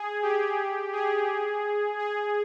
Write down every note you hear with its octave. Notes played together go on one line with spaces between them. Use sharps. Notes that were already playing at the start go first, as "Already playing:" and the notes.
Already playing: G#4
G4
G#4
G#4